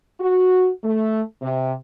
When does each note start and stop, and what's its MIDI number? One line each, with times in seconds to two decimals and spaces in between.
0.20 0.69 66
0.83 1.21 57
1.41 1.72 48